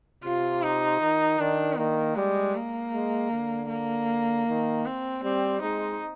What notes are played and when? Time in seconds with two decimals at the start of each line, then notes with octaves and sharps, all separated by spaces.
0.24 C3 F4
0.63 D#4
1.01 D#3
1.39 D#3 D4
1.78 D#3 A#3
2.16 G3 G#3
2.55 A#3
2.93 G#3
3.31 D3
3.70 A#3
4.47 D#3
4.85 C4
5.24 G3 C4
5.62 G#3 D#4